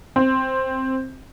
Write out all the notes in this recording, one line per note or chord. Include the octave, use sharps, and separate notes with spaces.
C4